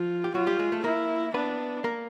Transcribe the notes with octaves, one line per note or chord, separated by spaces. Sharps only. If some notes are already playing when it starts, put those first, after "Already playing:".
Already playing: F3 F4
G4
F#3 F4 F#4
G3 G4
G#3 G#4
A3 A4
A#3 E4 A#4
B3 D4 B4
A#3 A#4